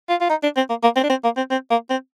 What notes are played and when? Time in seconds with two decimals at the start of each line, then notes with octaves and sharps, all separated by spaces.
0.09 F4
0.21 F4
0.30 D#4
0.43 D4
0.57 C4
0.69 A#3
0.83 A#3
0.96 C4
1.03 D4
1.10 C4
1.24 A#3
1.37 C4
1.51 C4
1.70 A#3
1.90 C4